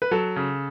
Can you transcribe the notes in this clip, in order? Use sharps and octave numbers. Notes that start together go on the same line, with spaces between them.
B4
F#3 A4
C#3